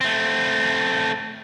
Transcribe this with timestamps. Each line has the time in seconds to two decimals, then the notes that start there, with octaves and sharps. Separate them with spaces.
0.01 A3 C4